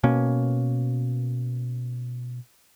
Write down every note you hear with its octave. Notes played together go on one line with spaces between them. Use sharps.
B2 A#3 C#4